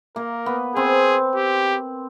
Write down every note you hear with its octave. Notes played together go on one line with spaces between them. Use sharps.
A#3 A#4
B3
C4 G#4
G4